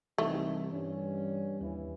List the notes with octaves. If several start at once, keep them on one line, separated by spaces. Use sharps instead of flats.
C2 E3 A3 D#4 G4
G2 C#4
D#2 E3